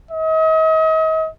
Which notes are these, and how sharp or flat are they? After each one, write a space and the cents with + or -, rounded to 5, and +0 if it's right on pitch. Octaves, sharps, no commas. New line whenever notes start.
D#5 +40